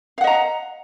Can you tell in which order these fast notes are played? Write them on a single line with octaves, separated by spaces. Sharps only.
F5 F#5 D#5 A#5